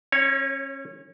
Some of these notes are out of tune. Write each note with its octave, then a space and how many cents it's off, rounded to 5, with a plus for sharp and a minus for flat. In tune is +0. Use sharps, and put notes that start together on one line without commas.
C#4 -35 C#5 +0